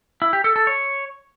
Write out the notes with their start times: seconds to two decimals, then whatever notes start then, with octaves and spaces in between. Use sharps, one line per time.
0.22 E4
0.33 G4
0.44 A4
0.56 A4
0.67 C#5